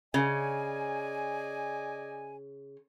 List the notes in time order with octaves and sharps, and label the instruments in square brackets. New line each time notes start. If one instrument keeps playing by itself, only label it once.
[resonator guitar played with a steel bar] C#3 [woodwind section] D5 D#5 G#5